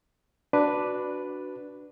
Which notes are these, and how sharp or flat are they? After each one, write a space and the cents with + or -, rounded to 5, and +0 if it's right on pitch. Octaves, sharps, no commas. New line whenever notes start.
D4 +0 F#4 +0 B4 +0